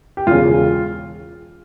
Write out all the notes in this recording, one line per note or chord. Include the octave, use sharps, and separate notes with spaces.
G4
E1 E2 C#3 F4